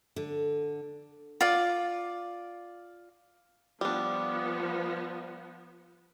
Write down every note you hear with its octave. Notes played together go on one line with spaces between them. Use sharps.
D3
F4 D5
F3 G3 B3 D4